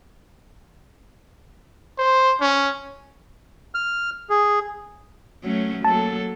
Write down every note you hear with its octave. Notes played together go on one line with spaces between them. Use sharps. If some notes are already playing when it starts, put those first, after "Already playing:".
C5
C#4
F6
G#4
F#3 A3 C#4
F#3 A#3 A4 A5